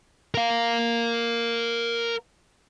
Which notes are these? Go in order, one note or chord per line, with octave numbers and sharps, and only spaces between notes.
A#4 F5